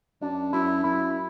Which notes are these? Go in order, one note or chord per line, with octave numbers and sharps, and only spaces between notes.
F#2 D4
F#2 E4
F#2 E4